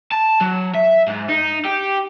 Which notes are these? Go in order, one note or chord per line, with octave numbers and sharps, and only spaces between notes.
A5
F#3
E5
G#2
D#4
G4